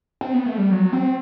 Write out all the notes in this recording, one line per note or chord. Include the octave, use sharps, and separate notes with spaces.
C4
B3
A3
G3
F#3
C4